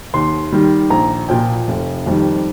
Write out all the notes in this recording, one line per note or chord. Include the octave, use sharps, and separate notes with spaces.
D#2 C6
D#3 G3
A#1 A#5
A#2 F3 G5
F1
F2 D#3 G3